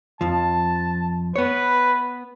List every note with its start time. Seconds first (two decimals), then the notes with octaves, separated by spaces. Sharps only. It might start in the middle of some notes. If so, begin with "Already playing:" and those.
0.21 F2 F3 A5
1.36 B3 B4 C#5